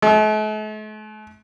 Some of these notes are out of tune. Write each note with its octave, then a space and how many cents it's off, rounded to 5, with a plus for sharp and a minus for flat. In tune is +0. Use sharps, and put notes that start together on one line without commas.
A3 -45